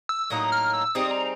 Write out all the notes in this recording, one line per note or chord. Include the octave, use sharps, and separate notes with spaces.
E6
A2 F#3 A#3 D#4 D#6
F6
E6
G3 C4 D#4 G#4 D#6
A#5